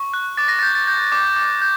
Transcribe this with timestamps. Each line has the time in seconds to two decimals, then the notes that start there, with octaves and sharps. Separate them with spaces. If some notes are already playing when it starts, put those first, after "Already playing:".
Already playing: C#6
0.14 F#6
0.37 D6 A6
0.48 A#6
0.59 A6
0.63 G6
0.75 A6
0.87 G6
1.12 D6
1.36 D6
1.62 G6